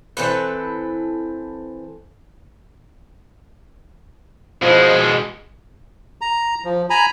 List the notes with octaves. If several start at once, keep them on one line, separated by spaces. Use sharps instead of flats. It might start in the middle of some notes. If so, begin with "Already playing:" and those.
E3 C4 A4 B4
B2 F3 G#3
A#5
F3
G#5 A#5 B5